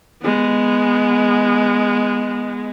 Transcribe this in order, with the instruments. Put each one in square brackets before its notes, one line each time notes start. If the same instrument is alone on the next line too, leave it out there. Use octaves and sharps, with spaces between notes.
[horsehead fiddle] G#3 B3